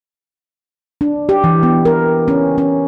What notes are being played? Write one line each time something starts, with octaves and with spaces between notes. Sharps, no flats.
D4
G4
E3
B3
A#4
C#4
C#4